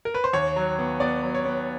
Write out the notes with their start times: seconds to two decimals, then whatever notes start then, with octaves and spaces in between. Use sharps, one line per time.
0.05 A#4
0.14 B4
0.24 C5
0.33 D#2 C#5
0.56 F#3
0.79 B3
1.00 B3 D5
1.23 F#3
1.35 C#5
1.45 B3